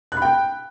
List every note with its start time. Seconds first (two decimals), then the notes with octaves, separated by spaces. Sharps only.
0.12 F#6
0.17 B5
0.22 G5